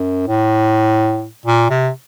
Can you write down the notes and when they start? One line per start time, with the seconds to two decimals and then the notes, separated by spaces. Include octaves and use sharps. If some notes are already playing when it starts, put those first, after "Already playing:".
Already playing: F#2
0.28 A2
1.46 A#2
1.70 C3